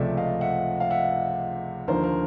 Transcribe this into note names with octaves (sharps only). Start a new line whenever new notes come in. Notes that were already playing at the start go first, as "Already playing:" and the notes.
Already playing: C#2 C3 F3 A3 D5 E5
D#5 F5
E5 F#5
F5
E5 F#5
D#2 D3 F3 A#4 C5
A#4